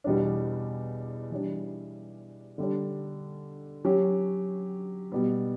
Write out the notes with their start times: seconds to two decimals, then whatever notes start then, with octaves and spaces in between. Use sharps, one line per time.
0.04 E2 B2 G3 D4
1.31 E3 G3 D4
2.58 D3 G3 D4
3.85 F#3 C#4 G4
5.12 B2 G3 B3